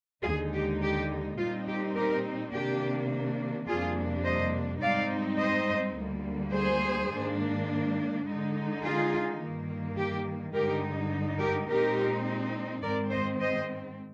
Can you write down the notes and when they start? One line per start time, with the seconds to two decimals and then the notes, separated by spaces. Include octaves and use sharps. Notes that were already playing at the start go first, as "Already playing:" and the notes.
0.23 D#2 D3 G#3 D#4 F4 G#4
0.52 G4
0.81 G4
1.37 A#2 G3 C4 D#4 F4
1.67 G4
1.95 G4 A#4
2.52 C3 D#3 A#3 D4 G4
3.66 F2 C3 G3 A#3 D4 F4 G#4
4.23 C5 D#5
4.81 G#2 G3 C4 D#4 D5 F5
5.38 C5 D#5
5.96 D2 D3 G3 A#3
6.52 G#4 C5
7.10 G#2 D#3 A#3 D4
8.25 D3 G#3 D#4
8.82 F4 G#4
9.39 G2 D#3 A#3
9.97 G4
10.53 G2 D3 G#3 D#4 G4 A#4
11.39 G4 A#4
11.68 A#2 G#3 C4 D#4 G4 A#4
12.82 G#2 D#3 G#3 C4 A#4 D5
13.11 C5 D#5
13.40 C5 D#5